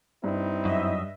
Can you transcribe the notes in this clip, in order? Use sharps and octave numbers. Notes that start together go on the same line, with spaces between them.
G2 C4 D#4 E4
F#2 D#5 E5